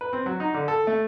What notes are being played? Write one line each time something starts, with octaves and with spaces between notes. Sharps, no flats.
B4
C4
F#3
D#4
D3
A4
A3